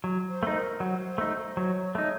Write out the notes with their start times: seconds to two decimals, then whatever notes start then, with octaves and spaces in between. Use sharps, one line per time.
0.04 F#3
0.29 C5
0.43 A3 D#4
0.55 A#4
0.80 F#3 C5
1.18 A3 D#4
1.57 F#3 C#5
1.95 A3 D#4 C#5